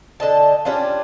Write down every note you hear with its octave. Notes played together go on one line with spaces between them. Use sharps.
D3 D#5 A5
G3 C#4 D4 F4